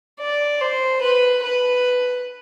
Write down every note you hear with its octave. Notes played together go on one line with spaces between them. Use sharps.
D5
C5
B4
B4